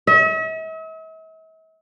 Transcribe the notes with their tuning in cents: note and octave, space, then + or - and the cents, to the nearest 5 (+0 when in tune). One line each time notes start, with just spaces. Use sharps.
E5 -45